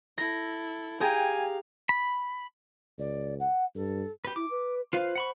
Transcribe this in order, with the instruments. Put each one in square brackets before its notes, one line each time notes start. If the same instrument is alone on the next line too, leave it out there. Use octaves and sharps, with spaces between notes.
[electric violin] E4 A4 [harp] A#6
[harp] G4 G#4 A#5 [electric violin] F5 [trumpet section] G5 G#5
[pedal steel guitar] B5
[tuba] C#2 [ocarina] D5
[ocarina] F#5
[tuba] G2 [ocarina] A4
[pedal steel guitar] G4 B4
[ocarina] E4 [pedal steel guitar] D6
[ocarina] B4
[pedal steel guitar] F4 B4 F5 [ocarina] C5
[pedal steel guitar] F#5 B5 C#6